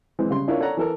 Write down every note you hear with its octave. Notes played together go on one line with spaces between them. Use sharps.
E3 G#3 C4
C#3 G3 C6
C#4 D4 E4 F4 A#4 C#5
A4 C#5 D5 F#5 A#5
E3 A4 A#4